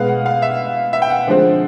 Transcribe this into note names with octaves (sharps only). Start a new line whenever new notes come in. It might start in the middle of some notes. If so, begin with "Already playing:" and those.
Already playing: B2 G#3 B3 F5
F#5
F5
E5
E5
G5
F#5
D3 F3 G#3 C4